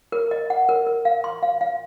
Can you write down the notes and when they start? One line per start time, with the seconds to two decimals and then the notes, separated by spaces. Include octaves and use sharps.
0.12 A#4
0.31 D#5
0.50 F#5
0.69 A#4
0.87 A#4
1.05 F5
1.24 C6
1.42 F5
1.61 F5